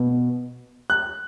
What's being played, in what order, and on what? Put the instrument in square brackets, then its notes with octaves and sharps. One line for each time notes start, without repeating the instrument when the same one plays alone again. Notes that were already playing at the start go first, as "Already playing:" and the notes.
Already playing: [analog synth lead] B2
[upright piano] F#6